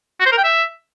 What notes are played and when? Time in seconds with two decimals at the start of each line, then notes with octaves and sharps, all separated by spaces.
0.20 F#4
0.26 C5
0.32 A#4
0.38 G5
0.44 E5